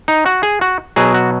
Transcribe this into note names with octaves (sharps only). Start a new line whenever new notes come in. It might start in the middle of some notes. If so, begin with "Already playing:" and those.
D#4
F#4
G#4
F#4
B2 F#3 G#4
F#4